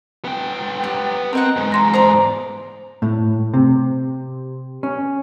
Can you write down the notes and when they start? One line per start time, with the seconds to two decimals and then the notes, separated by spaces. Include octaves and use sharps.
0.25 B3 G5
0.84 G4
1.33 C4 A#4 D#5 F#5
1.56 E2 G#2
1.72 A#5 C6 A#6
1.94 C5 D5 A#5 D#6
3.02 A2
3.54 C3
4.83 C#4